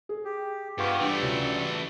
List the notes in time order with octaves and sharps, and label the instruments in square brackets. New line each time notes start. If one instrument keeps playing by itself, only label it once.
[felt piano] G#4
[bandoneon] G4
[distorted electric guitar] G2 [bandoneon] B3 F4 G4 [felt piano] B4 C#6
[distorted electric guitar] E3 A3 [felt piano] G3 D4
[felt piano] C#2 [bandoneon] F#3 G3
[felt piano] C#3